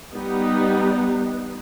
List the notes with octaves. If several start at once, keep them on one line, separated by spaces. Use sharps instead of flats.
G3 B3 D#4